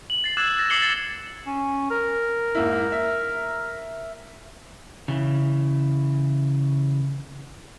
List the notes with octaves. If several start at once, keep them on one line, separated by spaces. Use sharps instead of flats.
F#7
A6 C7
D6 E6 F#6 G#6 A6 E7
A6 A#6
D6 C7 C#7 F#7 G7
A6 C7
C#4
A#4
G#2 A#3 E4
E5
C#3 E3